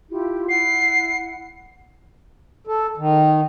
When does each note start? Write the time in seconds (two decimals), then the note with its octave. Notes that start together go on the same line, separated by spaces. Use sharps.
0.10 E4 F4 G4
0.49 E4 F#5 C7
2.67 A4
2.97 D#3